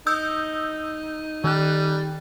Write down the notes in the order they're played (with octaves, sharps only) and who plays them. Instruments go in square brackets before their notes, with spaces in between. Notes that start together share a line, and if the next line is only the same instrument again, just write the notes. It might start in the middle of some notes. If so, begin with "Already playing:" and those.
[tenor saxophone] D#4 [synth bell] D#6 E6 G6
[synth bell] D#3 F#6 [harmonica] G3